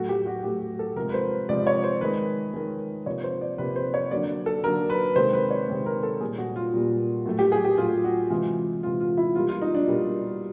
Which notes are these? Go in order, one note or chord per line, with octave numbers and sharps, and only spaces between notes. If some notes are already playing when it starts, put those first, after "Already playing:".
Already playing: A2 F#3 A3 F#4
G4
F#4
A2 F#3 A3 G4
A4
C3 F3 G#3 A#4
B4
C5
C3 F3 G#3 D5
C#5
C5
D#3 G#3 B4
D#3 G#3
C3 F3 A#3 C#5
C5
D5
C3 F3 A#3 B4
C5
C#5
D3 F#3 A#3 D5
A4
D3 F#3 A#3 A#4
B4
C3 D#3 G#3 C5
B4
C#5
C3 D#3 G#3 B4
A#4
A4
A#2 G3 A#3 G#4
F#4
F4
A#2 G3 A#3
A2 F#3 A3
G4
G#4
G4
A2 F#3 A3 F4
F#4
C3 E3 G#3 F4
C3 E3 G#3 F4
F4
E4
B2 G3 A#3 F4
F4
D#4
D4
B2 G3 A#3